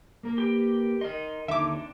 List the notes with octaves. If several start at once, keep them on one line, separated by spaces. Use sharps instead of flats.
A#3 A#4
G4 B4 G5
D#4 A#4 D#5 C6
D#2 D3 D#4 C#5 E5 D6
D#3 C4 D4